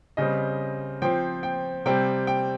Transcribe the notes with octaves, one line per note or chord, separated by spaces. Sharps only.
C#3 G3 C4 D#5
F3 C4 G5
G5
C3 G3 C4 G5
G5